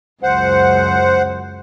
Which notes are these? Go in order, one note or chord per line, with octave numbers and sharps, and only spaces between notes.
C#2 F#2 C5 F#5